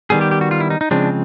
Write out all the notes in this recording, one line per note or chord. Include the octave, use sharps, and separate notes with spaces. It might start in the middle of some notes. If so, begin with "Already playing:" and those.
D#3 G3 B3 G#4
G4
G4
F#4
F4
E4
D#4
D#4
C#3 F3 G#3 C4 D4